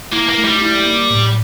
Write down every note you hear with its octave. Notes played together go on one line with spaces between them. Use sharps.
A#3 E4
A#3
A3
G3
E4
A#3
A2